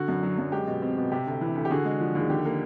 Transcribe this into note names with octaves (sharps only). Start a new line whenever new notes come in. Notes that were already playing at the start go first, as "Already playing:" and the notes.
Already playing: D3 F#4
F#2
F#3
F#2
G#3 G4
B2
C4
B2
C3 G4
D2
E3
D2
G4
D3 F#4 G#4
G#3
F3
D#2 G#4
D3 G4
A#3